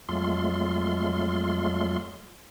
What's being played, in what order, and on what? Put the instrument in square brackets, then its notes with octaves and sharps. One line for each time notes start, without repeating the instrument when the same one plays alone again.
[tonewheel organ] F2 F#3 G#3 A3 F4 C6